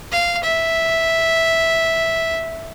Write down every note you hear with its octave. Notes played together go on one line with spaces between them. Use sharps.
F5
E5